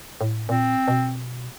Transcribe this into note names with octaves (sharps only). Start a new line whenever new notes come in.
A2
A#2 C4
B2